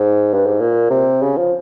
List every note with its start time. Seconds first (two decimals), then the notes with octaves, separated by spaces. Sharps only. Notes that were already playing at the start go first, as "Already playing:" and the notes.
Already playing: G#2
0.33 G2
0.46 G#2
0.60 A#2
0.90 C3
1.22 C#3
1.37 F3